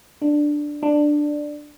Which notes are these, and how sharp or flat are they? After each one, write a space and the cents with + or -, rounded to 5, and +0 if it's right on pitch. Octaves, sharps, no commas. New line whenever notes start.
D4 +5
D4 +10